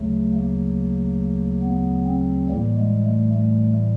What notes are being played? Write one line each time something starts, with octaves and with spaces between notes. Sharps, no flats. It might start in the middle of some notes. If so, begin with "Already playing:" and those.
Already playing: D2 C#3 F#3 A3
A#3
B3
C4
A2 E3 G3 A#3
G#3
A3
A3